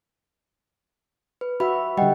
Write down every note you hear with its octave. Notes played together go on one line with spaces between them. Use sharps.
B4
F#4 E5 B5
D3 G3 D#5 F#5 G5